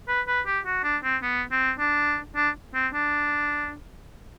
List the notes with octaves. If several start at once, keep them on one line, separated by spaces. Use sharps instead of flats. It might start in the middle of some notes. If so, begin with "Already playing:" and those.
B4
B4
G4
F#4
D4
C4
B3
C4
D4
D4
C4
D4